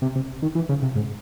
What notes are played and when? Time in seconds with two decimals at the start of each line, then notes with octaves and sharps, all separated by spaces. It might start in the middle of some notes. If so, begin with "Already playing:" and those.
0.02 C3
0.16 C3
0.42 D#3
0.55 E3
0.69 C#3
0.82 C3
0.96 G#2